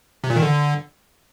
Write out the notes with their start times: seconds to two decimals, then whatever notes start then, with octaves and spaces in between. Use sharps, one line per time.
0.24 C3
0.30 A#2
0.36 D#3
0.42 D3